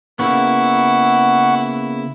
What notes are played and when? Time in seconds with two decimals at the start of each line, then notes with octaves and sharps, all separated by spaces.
0.19 C#3 A#3 B3 E4 F#5 C#6